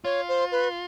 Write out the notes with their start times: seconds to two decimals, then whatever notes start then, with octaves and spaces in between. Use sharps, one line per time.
0.04 F4 C#5
0.28 C5
0.52 B4